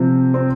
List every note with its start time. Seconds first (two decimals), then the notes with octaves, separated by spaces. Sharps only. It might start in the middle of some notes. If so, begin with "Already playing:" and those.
Already playing: C3 F3 C4 F4
0.34 C4